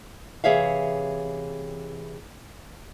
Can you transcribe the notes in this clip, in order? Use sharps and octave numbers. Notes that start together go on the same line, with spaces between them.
C3 E3 G#4 C#5 E5 F5